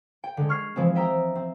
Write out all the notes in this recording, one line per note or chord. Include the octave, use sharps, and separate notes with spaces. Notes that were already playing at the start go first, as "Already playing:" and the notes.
G5
D3 G#3
C#6 F6 G#6 C7
E3 F3 G#3 C4
D#5 E5 G5 A#5 E6
C4